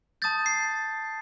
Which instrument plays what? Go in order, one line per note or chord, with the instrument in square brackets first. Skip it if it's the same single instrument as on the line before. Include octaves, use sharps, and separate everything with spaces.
[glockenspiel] A5 D#6 G6 A6
C7